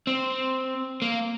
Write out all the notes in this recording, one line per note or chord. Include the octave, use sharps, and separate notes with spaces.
C4
A#3